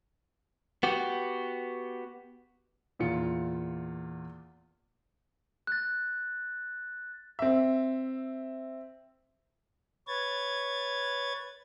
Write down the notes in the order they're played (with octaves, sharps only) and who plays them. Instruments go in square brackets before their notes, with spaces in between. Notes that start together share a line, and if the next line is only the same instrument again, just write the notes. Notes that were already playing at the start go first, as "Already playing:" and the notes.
[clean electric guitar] B3 F#4 G4
[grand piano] E2 A#2 F4 C#7
[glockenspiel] F#6 A6
[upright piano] C4 E5
[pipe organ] B4 C#5 G#6 A6